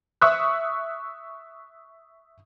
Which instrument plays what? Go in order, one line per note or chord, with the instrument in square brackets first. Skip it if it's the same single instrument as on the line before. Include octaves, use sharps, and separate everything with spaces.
[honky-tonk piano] E5 C#6 D#6 E6 F#6